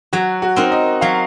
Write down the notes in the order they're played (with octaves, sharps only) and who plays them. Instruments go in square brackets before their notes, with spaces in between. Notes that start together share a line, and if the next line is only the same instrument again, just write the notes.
[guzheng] F#3 [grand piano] F#4
[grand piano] F#4
[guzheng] C4 D#4 A#4
[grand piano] D#5
[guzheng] F#3 [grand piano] F5